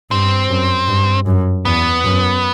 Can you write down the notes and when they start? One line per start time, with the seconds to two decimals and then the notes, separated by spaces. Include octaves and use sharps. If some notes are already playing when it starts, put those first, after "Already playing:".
0.11 G2 C4
0.49 F#2
0.87 G2
1.26 F#2
1.65 E2 B3
2.04 F#2